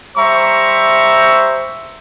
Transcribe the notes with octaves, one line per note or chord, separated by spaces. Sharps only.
G3 C5 E5 A#5 C#6